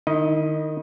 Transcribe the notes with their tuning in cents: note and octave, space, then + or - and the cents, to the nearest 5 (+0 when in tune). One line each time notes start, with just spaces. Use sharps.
D#3 -25 E4 -45 D#5 +0